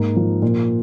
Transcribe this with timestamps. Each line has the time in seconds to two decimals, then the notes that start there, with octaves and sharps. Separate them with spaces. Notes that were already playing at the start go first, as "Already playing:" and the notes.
Already playing: G#2 A#3
0.16 F3
0.42 A#2